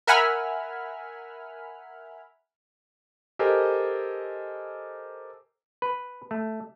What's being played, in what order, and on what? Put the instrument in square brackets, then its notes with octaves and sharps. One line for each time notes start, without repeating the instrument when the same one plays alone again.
[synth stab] A#4 E5 F#5 G#5 B5 F6
[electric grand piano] G4 A4 A#4 C5 D#5 G#5
[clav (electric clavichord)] B4
A3